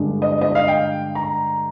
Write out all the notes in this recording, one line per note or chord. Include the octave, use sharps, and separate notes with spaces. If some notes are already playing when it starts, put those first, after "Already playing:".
Already playing: G2 D3 G#3 D4
D#5
D#5
F5
G5
A#5